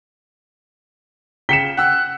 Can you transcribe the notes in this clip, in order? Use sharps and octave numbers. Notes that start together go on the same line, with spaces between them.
C#3 G5 B6 C#7 E7 G7
F#5 G5 E6 F#6